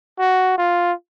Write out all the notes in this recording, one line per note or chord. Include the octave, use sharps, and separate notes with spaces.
F#4
F4